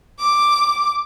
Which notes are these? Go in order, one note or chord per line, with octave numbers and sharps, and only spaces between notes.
D6